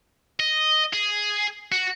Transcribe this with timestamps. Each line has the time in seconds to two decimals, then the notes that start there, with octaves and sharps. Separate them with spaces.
0.40 D#5
0.93 G#4
1.72 F#4